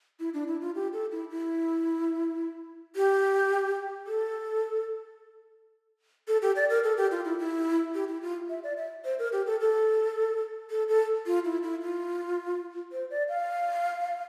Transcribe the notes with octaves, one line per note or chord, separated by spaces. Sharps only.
E4
D4
E4
F4
G4
A4
E4
E4
G4
A4
A4
G4
D5
A#4
A4
G4
F4
E4
E4
G4
E4
F4
E5
D5
E5
C5
A#4
G4
A4
A4
A4
A4
F4
E4
E4
F4
C5
D5
F5